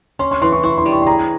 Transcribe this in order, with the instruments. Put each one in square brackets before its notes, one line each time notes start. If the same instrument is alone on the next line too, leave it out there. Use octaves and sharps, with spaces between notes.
[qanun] C#4 [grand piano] C6
[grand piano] C6
[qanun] E3 [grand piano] C6
[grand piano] C#6
[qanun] E4 [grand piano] C#6
[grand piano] C6
[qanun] G3
[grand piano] C#6
C6
[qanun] G#4 [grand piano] A#5